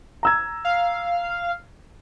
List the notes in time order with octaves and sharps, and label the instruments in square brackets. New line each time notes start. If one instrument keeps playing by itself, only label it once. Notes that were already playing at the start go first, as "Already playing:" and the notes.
[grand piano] A#5 E6 G#6
[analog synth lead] F5